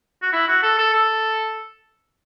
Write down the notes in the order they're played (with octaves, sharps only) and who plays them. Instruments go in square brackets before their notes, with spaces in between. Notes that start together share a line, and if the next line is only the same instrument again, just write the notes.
[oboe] F#4
E4
F#4
A4
A4
A4